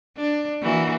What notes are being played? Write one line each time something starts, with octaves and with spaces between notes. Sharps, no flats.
D4
E3 A#3 F#4